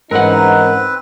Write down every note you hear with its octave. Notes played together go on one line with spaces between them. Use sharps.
G#2 E3 C4 C#4 D#4 A#4 B4 F#5